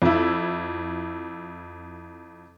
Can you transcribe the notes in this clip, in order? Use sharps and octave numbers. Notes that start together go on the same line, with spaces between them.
F2 E4